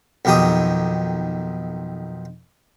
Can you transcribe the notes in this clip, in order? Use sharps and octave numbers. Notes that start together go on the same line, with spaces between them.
B1 F2 D#3 G4 D#6